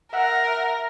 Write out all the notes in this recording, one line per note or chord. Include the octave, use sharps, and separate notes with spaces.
A#4 E5 F#5